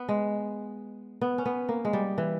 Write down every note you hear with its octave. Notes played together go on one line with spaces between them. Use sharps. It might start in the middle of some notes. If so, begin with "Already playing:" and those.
Already playing: B3
G#3
B3
C#4
B3
A#3
G#3
G3
E3